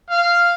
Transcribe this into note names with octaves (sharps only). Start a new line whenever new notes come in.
F5